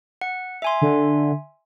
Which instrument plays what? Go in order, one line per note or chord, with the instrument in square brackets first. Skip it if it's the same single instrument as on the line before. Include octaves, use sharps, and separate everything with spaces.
[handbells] F#5
E5 G#5 C6
[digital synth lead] D3